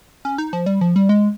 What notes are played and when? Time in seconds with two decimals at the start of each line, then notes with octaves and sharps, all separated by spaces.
0.25 C#4
0.38 D#4
0.53 F3
0.66 G3
0.81 F3
0.96 G3
1.09 G#3